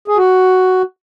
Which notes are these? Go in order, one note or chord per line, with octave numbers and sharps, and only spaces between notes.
G#4
F#4